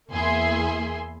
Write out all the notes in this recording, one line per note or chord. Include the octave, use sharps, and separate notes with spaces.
E2 A#3 E4 G#4 E5 C6